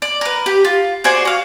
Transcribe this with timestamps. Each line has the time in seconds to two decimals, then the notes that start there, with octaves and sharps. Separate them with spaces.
0.02 D5
0.21 A#4 B4
0.46 G4
0.65 F4
1.04 F#4 G#4 C5 D5
1.25 F#4 F5